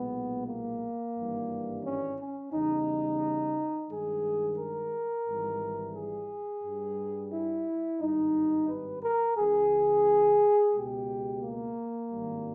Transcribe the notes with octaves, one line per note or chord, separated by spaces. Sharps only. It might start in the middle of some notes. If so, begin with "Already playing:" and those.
Already playing: B1 A#2 G#3 B3
A#3
G#1 G2 E3 G3
C#4
C#4
E2 C#3 G3 D#4
G2 D#3 G#3 G#4
A#4
G#1 G#2 E3 G3
G#4
G2 G3
E4
G#1 G2 G3 D#4
B4
A#4
C#2 C#3 E3 G#3 G#4
C#2 B2 G#3 G4
A#3
G#1 G2 D#3 G3